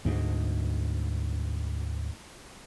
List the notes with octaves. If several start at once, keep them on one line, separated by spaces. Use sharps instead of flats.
D2 G#2